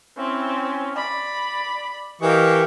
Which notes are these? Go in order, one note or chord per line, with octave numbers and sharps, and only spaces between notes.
C4 C#4 E4
D5 B5
E3 G4 A#4 D#5 F5 G5 C#6